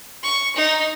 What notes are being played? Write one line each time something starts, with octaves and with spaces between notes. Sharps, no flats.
C#6
D#4